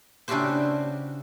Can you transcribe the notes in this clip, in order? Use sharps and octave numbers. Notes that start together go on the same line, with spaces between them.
C#3 D4 E4 F#4 G4 C5